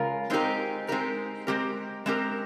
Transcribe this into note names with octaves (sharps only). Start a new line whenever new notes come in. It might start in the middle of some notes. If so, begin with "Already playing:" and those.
Already playing: C#3 G#3 F4 A#4
G#3 C4 D#4 G4 A#4
G#3 C4 D#4 G4 A#4
G#3 C4 G4 A#4
G#3 C4 G4 A#4